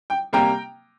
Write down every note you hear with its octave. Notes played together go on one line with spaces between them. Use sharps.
G5
C3 G3 A#3 G5 A#5